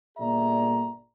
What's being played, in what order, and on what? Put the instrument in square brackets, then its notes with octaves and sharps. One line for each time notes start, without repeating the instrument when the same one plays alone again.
[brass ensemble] G1 A#2 G#4 D5 E5 A#5